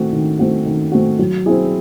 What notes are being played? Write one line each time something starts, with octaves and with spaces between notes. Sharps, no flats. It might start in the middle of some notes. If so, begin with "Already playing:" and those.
Already playing: D#3 A3 C4 F#4
D#3
A3 C4 F#4
D#3
A3 C4 F#4
F#3
C4 E4 G#4